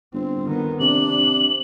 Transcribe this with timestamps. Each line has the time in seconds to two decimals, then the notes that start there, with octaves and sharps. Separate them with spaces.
0.13 G1 C4
0.46 D#3 B3
0.80 C3 D4 F#7